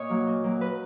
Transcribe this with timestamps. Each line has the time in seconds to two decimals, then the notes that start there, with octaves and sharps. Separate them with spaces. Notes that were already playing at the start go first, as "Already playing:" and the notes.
Already playing: A#2 C#5 D#5
0.09 F#3 A#3
0.27 A#2
0.44 F#3 A#3
0.61 B4